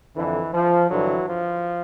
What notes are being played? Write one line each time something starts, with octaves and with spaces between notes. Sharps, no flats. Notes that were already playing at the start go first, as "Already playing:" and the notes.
F2 D3 E3
F3
G2 D3 E3 F#3
F3